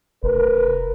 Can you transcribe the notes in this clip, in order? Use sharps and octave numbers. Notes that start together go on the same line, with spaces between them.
F1 A#4 B4